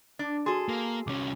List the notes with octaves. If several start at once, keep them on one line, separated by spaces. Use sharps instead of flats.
D4
F#4 G#4 A4 C6
A#3
C2 C#4 D6